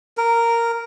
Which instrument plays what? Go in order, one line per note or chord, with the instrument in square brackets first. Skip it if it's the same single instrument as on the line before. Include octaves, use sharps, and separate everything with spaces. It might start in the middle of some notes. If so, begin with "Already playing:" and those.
[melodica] A#4